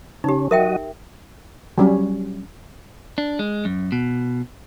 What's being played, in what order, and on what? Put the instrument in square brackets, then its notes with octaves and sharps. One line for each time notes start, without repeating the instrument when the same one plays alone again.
[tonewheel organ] C#3 C#4 [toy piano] D#4 G4
[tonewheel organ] F#3 F#4 D#5 [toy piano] A#4 E5 G5
[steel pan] F#3 G3 C#4
[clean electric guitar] D4
G#3
F#2
B2